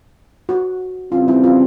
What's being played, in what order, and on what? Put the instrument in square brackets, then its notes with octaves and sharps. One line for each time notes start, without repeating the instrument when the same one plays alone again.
[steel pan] F#4
[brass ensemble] C#3 E3 G3 C4 [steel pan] F4
[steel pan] E4
F4